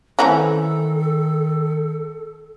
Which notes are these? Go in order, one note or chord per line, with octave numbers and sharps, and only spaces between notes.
D#3 E3 A3 C4 C#4 A4 F#5 A#5